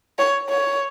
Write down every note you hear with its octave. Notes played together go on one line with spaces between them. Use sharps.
C#5
C#5